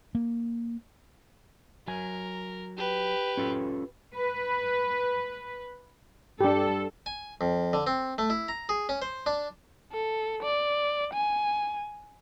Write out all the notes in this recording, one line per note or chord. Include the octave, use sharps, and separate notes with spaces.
A#3
F#3 A#4 G#5
G4 B4
C#4 F4 A4
B4
G2 D4 G4 A4
G#5
F2
D3
C4
A3
E4
A#5
G#4
C#4
C5
D4
A4
D5
G#5